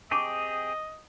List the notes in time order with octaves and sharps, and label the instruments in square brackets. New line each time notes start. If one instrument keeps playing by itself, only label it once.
[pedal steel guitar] C4 G4 G#4 [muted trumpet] D#5 [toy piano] A5 C#6 D6